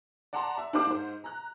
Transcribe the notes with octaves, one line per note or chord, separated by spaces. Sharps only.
D5 F#5 A5 A#5 C6
E5
D4 D#4 G4 C5 F5 D6
G#2 C5
A#5 F#6